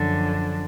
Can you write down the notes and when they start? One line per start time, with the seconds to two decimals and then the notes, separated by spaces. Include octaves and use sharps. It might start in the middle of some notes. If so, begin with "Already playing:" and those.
Already playing: F#2 D3 F3